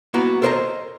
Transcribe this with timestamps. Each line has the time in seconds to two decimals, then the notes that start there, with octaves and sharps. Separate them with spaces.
0.14 A#3 B3 E4 F#4 A#5
0.42 A4 A#4 C5 D5 D#5 A#5